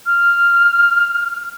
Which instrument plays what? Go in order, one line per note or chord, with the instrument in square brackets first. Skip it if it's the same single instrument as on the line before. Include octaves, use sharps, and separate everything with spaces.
[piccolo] F6